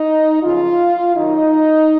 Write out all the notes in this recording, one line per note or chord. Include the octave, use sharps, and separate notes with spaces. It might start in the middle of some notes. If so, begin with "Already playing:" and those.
Already playing: D#4
F#2 C#3 F3 F4
F#2 D#3 D#4